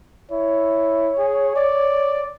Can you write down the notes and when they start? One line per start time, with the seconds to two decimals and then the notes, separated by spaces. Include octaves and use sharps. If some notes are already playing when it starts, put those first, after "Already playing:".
0.32 E4 C#5
1.18 G#4
1.56 D5